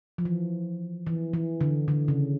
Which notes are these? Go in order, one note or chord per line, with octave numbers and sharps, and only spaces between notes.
F3
E3
E3
E3
D3
D3
C#3